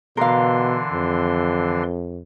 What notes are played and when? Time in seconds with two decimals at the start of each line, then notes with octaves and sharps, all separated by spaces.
0.17 B2 D3 E3 A#4 F5 C6
0.92 F2